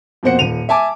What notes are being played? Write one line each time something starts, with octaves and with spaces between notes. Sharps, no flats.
F2 B2 A#3 C5 F#5 C#7
D#1 D#7 F7
E5 G#5 A5 D6